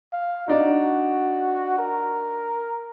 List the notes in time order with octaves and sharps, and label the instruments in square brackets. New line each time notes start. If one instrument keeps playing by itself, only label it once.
[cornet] F5
[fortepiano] D4 D#4 [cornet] F#4
[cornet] A#4